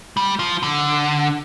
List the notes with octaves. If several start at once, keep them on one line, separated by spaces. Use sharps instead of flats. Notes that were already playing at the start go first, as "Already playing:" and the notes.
G3
F3
D3